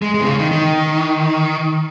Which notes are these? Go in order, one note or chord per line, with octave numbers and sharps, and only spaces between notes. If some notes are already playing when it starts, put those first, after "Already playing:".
G#3
G#3
C3
C#3
D#3
D#3